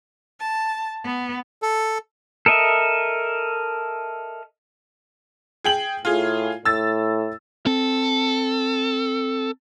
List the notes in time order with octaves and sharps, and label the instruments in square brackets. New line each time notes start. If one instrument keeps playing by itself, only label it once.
[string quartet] A5
B3
[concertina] A4
[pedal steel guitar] A4 A#4 D#5 E5
[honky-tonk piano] G#4 G5 F#7
[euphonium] A2 [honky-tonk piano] F4 G#4
[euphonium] A2 [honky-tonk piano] E6 A6
[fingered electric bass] C4 [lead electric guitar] A4